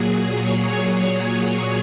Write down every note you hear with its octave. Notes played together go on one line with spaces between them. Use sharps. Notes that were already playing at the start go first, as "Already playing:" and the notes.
Already playing: A#2 F#3 G#4
C#5